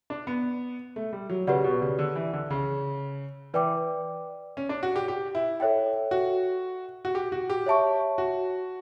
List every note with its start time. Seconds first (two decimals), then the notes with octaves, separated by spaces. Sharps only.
0.10 D4
0.27 B3
0.96 A3
1.13 G3
1.30 F#3
1.47 C#3 G4 B4 D5 F#5
1.64 B2
1.82 C#3
1.99 D3
2.16 E3
2.34 D3
2.51 C#3
3.54 E3 B4 D5 G5 D6
4.57 C#4
4.69 D4
4.83 F#4
4.96 G4
5.08 G4
5.35 E4
5.60 A4 C#5 E5 G5
6.11 F#4
7.05 F#4
7.15 G4
7.32 F#4
7.50 G4
7.66 C#5 E5 A5 C#6
8.18 F#4